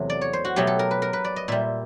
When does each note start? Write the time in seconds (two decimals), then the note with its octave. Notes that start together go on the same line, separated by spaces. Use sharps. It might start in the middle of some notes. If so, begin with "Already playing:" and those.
Already playing: E2 C3 F#3 A3
0.10 D5
0.21 C#5
0.33 C5
0.45 F#4
0.56 B2 F#3 A3 G4
0.67 A4
0.79 A#4
0.91 B4
1.02 A#4
1.13 B4
1.24 D5
1.36 D#5
1.48 A#2 G3 E5